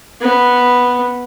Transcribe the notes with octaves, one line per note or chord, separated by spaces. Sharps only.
B3